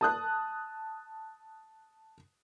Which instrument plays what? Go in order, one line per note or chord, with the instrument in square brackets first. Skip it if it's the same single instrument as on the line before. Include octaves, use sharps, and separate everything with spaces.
[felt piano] A5 D#6 F#6